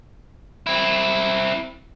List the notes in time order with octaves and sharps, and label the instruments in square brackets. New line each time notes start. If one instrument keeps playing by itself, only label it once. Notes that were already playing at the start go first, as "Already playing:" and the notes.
[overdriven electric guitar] C4 E4